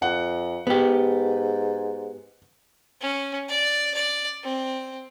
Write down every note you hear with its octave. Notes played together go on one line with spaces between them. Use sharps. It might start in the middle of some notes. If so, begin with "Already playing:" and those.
F2 F#5
G#2 B3 G4
C#4
D5
D5
C4